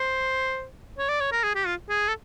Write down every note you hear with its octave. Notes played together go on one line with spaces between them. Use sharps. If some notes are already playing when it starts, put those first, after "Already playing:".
Already playing: C5
C#5
D5
C#5
A#4
G#4
G4
F4
G#4
A4